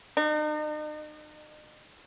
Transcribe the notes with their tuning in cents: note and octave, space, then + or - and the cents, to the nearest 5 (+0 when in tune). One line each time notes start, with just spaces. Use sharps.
D#4 -40